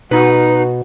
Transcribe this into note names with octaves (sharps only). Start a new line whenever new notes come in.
B2 D#4 F#4 B4